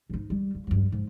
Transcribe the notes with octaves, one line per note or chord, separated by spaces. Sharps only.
G#2 D#4
G3
C#3
G2 F#3
G#2